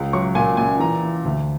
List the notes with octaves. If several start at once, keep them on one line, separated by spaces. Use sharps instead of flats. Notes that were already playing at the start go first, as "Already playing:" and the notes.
Already playing: C#2
F#3 C#6
A#2 G#5
A#2 G#5
E3 A#5
E3
D2